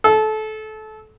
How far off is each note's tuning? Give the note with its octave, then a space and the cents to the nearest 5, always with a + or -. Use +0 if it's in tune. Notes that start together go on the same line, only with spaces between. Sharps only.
A4 -25